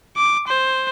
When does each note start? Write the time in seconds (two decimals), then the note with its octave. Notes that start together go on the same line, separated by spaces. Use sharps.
0.17 D6
0.48 C5